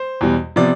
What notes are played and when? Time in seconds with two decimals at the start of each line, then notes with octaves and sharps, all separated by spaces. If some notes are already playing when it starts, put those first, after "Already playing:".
Already playing: C5
0.21 E2 B2 G3
0.56 C3 F3 B3 D5